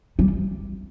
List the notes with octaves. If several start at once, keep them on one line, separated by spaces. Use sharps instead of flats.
G3